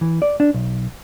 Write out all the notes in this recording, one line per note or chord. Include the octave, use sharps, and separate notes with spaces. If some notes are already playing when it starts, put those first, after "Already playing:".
E3
D5
D4
B1